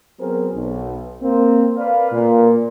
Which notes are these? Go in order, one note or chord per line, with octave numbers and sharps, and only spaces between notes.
F#3 B3 C4 G#4 A#4 C5
B1
A#3 C4
A#4 B4 D5 F5
A#2